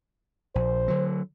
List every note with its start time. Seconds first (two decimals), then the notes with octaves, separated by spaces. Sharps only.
0.55 A#1 C5
0.88 D3 F#3